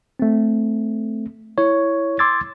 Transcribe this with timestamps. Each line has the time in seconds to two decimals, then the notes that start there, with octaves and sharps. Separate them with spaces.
0.19 A3 C4
1.58 E4 C#5
2.19 C6 D6 E6 G#6 A6